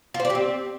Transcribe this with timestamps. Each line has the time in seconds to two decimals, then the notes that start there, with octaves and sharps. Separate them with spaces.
0.14 F4
0.20 C5
0.25 D5
0.30 G4
0.35 C4